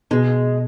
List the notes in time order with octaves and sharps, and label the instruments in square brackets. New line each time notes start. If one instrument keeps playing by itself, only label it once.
[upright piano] B2 [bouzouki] G#3